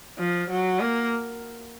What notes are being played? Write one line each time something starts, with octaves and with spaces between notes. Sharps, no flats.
F3
F#3
A#3